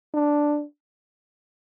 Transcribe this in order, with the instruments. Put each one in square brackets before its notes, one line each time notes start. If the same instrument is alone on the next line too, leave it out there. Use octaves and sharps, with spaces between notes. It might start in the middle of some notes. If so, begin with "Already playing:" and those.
[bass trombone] D4